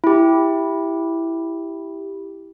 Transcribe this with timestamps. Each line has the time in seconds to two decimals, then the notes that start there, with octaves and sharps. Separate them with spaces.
0.04 E4 G4